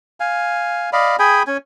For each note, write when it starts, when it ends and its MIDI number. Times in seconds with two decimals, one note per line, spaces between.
0.20 0.90 77
0.20 0.90 80
0.93 1.16 74
0.93 1.16 75
0.93 1.16 77
0.93 1.16 83
1.19 1.43 68
1.19 1.43 79
1.19 1.43 80
1.19 1.43 83
1.47 1.57 61
1.47 1.57 80